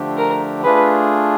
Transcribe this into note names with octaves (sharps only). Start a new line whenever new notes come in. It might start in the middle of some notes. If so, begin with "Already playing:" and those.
Already playing: D3 F3 A3 D4 G4
A#4
A3 D4 F4 G#4 B4